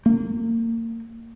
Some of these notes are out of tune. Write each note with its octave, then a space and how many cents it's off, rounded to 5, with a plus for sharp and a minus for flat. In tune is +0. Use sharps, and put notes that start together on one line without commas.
A#3 -30